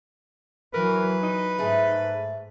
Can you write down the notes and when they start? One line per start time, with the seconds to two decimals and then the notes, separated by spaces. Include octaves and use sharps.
0.74 E3 F#3 A#4 B4
1.23 D#4
1.59 G#2 A3 G#4